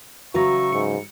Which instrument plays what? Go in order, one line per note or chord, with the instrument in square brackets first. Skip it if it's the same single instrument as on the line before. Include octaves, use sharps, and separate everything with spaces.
[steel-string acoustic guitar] C#3 F#3 B4 [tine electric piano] F#4 A#5 A#6 [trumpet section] E5 C#6
[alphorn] G#2 [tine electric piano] C#7